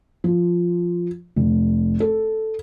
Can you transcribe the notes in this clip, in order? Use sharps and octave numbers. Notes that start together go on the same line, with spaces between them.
F3
F1
A4